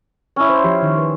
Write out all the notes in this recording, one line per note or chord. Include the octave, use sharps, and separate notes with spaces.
C#4 E4
C5
F3 G4
D#3
B4